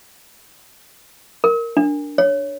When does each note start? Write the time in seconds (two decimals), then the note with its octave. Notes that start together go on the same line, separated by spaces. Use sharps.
1.44 A#4
1.77 D4
2.18 C#5